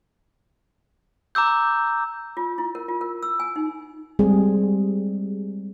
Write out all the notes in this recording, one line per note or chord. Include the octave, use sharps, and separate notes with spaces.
A#5 D6 E6 G6
F4
E4
A#4
F4
A#4
E6
G#5
D#4
G3 G#3 C4 G#4